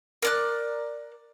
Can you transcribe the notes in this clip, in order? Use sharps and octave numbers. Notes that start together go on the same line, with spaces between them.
A#4 D5 F#6